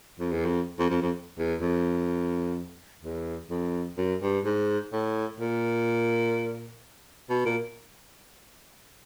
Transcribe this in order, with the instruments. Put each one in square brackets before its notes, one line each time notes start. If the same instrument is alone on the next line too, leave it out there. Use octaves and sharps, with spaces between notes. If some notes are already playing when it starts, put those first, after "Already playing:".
[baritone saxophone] F2
E2
F2
F2
F2
F2
E2
F2
E2
F2
F#2
G2
G#2
A2
A#2
B2
A#2